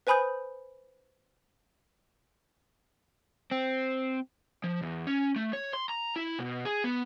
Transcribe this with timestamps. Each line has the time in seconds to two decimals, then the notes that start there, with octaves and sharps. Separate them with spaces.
0.07 B4 C5 G#5 B5 D#6 G6
3.51 C4
4.64 F3
4.83 E2
5.07 C#4
5.36 A3
5.53 C#5
5.73 C6
5.89 A#5
6.16 E4
6.39 B2
6.65 G#4
6.84 B3